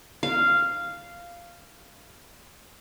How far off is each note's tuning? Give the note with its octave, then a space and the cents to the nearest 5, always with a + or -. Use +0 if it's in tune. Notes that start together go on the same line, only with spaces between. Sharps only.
F5 -10